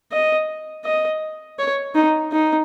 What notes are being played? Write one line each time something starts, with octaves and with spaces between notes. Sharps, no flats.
D#5
D#5
C#5
D#4
D#4